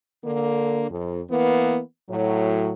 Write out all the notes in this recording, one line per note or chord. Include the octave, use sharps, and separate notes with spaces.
D3 A#3
F2
E3 A#3 B3
A2 F#3